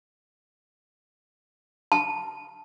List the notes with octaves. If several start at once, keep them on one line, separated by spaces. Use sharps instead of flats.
A5